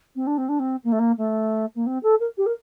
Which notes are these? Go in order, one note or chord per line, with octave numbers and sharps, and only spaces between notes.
C4
D4
C4
D4
C4
A#3
A3
A#3
A3
A#3
C4
A4
A#4
G4
A#4